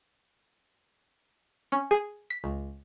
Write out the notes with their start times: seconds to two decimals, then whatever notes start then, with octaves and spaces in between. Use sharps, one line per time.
1.72 C#4
1.91 G#4
2.30 B6
2.44 C#2